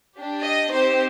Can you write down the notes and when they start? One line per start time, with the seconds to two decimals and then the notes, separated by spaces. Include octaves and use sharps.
0.16 D4 G4
0.44 D#5
0.71 C4 D#4 G4 C5